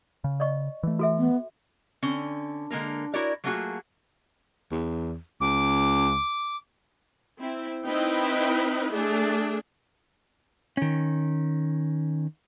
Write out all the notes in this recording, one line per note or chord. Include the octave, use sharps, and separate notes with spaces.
C#3
D5 D#5 C#6
E3 A3
F#4 A4 E5
B3
D3 C4 C#4
D3 G#3 A#3 A#4
E4 F#4 A#4 C#5 D5
F#3 A3 A#3 F4 F#4 G#4
E2
C#2 D6
C4 E4
C4 D#4 E4 B4 D#5 G5
A3 D4 G#4
D#3 C#4